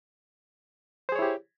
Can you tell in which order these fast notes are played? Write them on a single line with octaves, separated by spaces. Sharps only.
C5 G#4 C#5 E4 G4